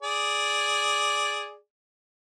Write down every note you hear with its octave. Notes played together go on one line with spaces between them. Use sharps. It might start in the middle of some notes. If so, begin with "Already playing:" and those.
G#4 D5